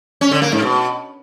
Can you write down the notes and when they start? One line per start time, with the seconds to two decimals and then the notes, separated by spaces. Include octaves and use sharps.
0.21 C#4
0.31 D3
0.42 A#3
0.52 G#2
0.62 B2